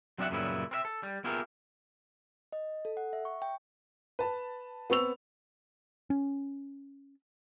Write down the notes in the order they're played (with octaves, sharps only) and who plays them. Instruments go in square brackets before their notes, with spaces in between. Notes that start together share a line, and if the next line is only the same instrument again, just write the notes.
[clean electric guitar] F#3 C4 D4 C#5 E5 F#5
F#2 A#2 C#3 G3 B3 E4
C4 A#4 E5
A4
G3
B3 E4 F4 G4 G#4 A#4
[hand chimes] D#5
A4
F#5
E5
C#6
G5
[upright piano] B4 A5
B3 C4 C#6 E6 F7
[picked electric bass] C#4